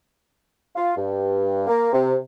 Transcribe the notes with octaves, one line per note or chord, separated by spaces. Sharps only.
F4
G2
A#3
C3